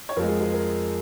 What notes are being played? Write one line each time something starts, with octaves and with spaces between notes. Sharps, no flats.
C#5
F2 F3 G#3 A#4
G#4
G#4
A#4